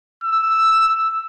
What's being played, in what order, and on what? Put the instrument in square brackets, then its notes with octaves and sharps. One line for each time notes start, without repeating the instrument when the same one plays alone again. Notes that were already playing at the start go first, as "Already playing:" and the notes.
[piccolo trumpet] E6